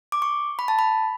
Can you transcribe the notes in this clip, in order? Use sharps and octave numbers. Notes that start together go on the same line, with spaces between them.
D6
C#6
B5
A5
B5